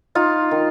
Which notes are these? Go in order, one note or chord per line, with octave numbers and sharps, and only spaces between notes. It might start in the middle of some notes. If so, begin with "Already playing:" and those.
D#4 F4
D#3